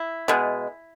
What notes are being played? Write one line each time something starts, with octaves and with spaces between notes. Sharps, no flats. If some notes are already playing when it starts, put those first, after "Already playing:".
Already playing: E4
B2 G#3 B3